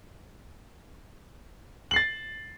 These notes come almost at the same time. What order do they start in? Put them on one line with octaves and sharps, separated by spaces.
F#7 C7 A6